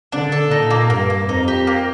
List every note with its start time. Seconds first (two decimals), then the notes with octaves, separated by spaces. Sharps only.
0.12 D3 D4
0.32 A4
0.51 A#2 D#4
0.70 A#3
0.90 G2 A#3
1.10 A#3
1.28 F2 D#4
1.48 G4
1.67 A#3